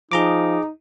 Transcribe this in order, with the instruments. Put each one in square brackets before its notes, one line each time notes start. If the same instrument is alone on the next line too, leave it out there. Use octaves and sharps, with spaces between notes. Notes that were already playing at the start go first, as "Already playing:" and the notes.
[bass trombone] F3 [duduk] D#4 [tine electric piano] G#4 A#5 D6